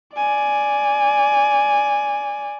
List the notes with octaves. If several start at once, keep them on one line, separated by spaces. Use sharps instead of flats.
D5 G#5